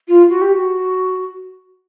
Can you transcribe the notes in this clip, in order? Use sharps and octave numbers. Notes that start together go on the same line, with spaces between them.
F4
F#4
G4
F#4